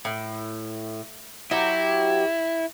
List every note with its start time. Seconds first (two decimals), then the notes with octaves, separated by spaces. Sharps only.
0.05 A2
1.51 F#3 E4 G4